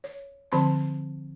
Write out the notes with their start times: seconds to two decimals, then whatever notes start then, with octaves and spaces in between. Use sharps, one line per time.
0.04 C#5
0.52 D3 F3 C4 A5 B5 C6